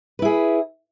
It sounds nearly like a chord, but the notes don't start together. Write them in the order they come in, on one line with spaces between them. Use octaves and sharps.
B4 E4 G#4